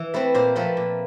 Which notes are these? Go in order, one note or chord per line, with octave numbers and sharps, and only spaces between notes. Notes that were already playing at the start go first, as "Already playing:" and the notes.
Already playing: E3
A3 C4 B4
A#2 C5
F3 A3 C4 B4
A#2